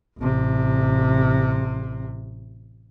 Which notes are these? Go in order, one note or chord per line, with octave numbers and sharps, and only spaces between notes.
A1 C3